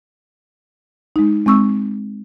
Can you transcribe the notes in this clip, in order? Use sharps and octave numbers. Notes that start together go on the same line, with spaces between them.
G#3 D#4
G#3 C4 C#6 E6